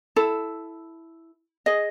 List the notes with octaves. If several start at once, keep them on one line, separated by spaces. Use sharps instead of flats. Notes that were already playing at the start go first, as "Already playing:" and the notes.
E4 A4
G#4 D#5